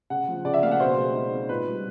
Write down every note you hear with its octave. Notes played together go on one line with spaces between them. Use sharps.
C#3 F#5
F3
C#3 D5
E5
A#3 F5
F#5
B2 C5
G#3
D#4
C4
A#2 B4
G3